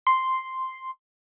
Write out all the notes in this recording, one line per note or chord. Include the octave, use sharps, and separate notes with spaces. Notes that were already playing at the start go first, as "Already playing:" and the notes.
C6